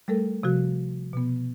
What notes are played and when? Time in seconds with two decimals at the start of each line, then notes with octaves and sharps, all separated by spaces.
0.08 G3 A3 A4 A#4
0.43 C3 F3 F#4
1.13 B2 B3